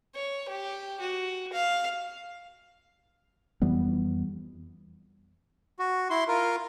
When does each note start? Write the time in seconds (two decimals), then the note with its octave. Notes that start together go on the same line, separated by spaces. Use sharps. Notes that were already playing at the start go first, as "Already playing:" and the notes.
0.15 C#5
0.49 G4
1.00 F#4
1.53 F5
3.62 F2 E3 G3 B3
5.79 F#4
6.10 E4 C6
6.28 F4 A#4